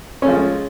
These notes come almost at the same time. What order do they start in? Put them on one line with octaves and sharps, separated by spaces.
C#4 A3 F3 G#3